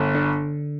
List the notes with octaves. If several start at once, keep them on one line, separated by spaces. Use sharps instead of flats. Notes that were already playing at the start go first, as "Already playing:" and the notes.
Already playing: G1
D3